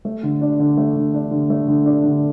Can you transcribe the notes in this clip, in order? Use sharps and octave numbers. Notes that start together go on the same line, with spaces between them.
A3
D3
D4
D3
A3
D3
D4
D3
A3
D3
D4
D3